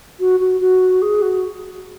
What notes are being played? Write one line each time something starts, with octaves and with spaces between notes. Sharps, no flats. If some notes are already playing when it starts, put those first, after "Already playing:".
F#4
F#4
F#4
G#4
F#4